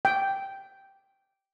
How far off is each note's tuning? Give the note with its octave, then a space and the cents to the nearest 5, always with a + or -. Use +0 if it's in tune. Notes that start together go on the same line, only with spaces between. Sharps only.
G5 -5